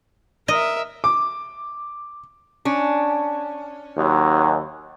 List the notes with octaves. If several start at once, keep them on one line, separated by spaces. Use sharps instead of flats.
A#4 D#5 E5
D6
C#4 D4
D#2 F#3